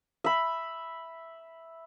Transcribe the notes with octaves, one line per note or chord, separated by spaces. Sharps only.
E5 B5